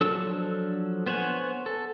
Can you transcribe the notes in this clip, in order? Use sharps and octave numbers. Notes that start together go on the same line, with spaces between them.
F3 F#3 D4 A4 E6
B3 C5 C#5 F#5 G#5
A4